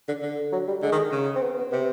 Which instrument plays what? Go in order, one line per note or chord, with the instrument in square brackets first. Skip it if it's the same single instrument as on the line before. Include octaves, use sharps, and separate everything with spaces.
[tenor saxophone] D3
D3
[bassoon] F#3
G3
[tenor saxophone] D3 [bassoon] G#3
[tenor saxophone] D#3
C#3
[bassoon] C4
B3
B3
[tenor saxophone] C3 [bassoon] B3